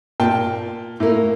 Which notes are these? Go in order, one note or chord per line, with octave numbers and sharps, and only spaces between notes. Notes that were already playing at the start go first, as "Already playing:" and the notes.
A#2 G5 A5
A2 A#3